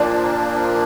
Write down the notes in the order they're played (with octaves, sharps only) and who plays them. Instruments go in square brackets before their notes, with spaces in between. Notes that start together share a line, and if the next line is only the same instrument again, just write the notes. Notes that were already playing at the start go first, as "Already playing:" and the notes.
Already playing: [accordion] A#2 F3 A#3 D4 [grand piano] D5